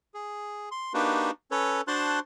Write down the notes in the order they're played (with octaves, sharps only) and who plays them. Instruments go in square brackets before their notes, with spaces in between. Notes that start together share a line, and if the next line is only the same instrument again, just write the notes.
[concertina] G#4
C6
A#3 D4 D#4 F#4 G4 B4
C#4 A4 B4 C#5
D4 F#4 C5 A5 C6 F#6